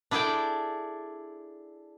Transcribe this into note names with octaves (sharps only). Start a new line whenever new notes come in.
D4 E4 G#4 A4 D5 G5